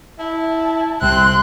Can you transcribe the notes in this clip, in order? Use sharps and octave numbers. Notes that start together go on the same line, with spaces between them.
E4 A5
C2 C4 C6 F#6